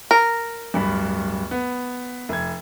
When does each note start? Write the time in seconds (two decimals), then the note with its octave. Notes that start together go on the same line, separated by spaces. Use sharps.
0.11 A#4
0.74 D1 G2 B5
1.51 B3
2.29 F1 G#6